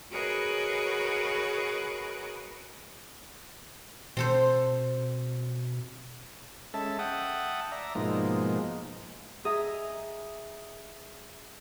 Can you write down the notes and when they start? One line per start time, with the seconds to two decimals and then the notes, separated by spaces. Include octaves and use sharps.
0.12 F#4 G#4 A#4 B4 C#5 D#5
4.17 B2 C4 A4 C5
6.74 G#3 C#4 A4 E5 A5
6.99 E5 F#5 G5 A5 D#6
7.72 D5 E5 A#5
7.95 G#2 B2 F3 G#3 A#3 D#4
9.45 G#4 D#5 E5 G#5 A#5 D#6